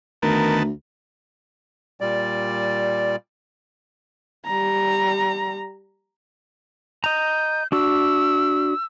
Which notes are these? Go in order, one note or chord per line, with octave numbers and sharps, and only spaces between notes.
D2 D#3 B3 A#4 A5
A#2 G3 D5
G3 A#5
D#5 A#5 G6
D4 F#4 E6